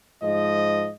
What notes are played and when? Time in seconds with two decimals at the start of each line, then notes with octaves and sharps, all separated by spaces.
0.22 G#2 F3 D#5